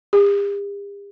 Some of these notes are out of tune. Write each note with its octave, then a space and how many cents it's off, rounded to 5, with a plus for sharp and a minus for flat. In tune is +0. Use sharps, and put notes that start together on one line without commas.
G4 +45